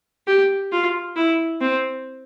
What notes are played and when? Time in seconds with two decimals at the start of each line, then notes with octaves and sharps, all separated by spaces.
0.27 G4
0.72 F4
1.16 E4
1.61 C4